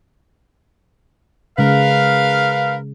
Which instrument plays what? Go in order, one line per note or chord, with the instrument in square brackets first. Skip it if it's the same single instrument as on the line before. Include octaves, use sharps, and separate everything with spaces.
[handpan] C#3 G#3 [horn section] A#4 B4 F5